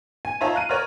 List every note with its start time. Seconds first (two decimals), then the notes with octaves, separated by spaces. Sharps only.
0.25 G#5
0.41 D#4 F4 C#5 E5 A5 A#5
0.54 F5 F#6 D#7
0.69 A#4 C#5 D5 A#5 F6